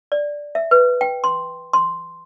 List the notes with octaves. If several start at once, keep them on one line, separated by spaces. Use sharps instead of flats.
D5
E5
B4
G5
C6
C6